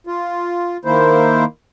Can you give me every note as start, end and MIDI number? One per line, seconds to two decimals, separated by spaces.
0.07 0.77 65
0.85 1.44 51
0.85 1.44 58
0.85 1.44 64
0.85 1.44 72